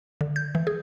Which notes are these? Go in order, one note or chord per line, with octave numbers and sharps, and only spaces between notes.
D3
G6
E3
G#4